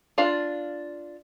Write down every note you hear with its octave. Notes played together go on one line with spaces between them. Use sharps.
D4 F4 F5